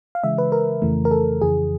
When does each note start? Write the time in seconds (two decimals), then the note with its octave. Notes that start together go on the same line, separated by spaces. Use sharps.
0.15 F5
0.24 C#3 E3 G#3 E5
0.38 B4
0.52 A#4
0.82 F2 C#3 E3 A3
1.05 A#4
1.11 A4
1.41 F2 C#3 E3 G#4